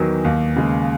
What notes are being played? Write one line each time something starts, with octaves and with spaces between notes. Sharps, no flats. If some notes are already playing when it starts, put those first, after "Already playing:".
Already playing: E2 D#3 F#3
D#2
C#3 G#3